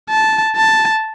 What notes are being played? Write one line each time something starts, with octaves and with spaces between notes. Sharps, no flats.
A5
A5